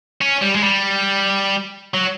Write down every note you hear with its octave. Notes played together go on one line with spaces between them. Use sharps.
C#4
G3
G#3
G3
F#3